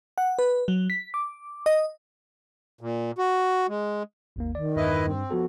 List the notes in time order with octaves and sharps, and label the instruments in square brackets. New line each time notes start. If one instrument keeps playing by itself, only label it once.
[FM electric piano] F#5
B4
F#3
B6
D6
D#5
[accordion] A#2
F#4
G#3
[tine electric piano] G#1 D#2 A#3
[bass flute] D#3 [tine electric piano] D5
[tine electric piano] E2 G2 [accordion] E4 B4 D#5
[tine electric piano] G2 [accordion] C4
[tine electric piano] F3 B3 A4 [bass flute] F#4